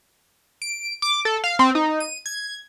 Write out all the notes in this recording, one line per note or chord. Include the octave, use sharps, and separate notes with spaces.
D7
D6
A4
F5
C4
D#4
D#7
G#6